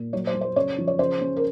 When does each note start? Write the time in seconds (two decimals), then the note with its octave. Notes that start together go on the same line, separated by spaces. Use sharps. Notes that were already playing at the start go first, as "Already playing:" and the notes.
Already playing: A#2
0.13 F#3 C#5
0.27 C5
0.34 F#3
0.41 C5
0.56 C#3 C#5
0.78 F3
0.87 C#5
0.99 C#3 C5
1.21 C#4
1.36 A#4